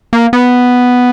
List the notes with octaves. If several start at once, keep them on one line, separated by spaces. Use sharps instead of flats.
A#3
B3